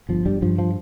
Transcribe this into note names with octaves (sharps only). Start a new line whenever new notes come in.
G1 F3
G2 G3
G2 F3
F3